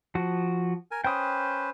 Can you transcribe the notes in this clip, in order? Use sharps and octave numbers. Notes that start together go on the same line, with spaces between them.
F3 F#4
A#4 G#5
C#4 B4 C5 G5 D#6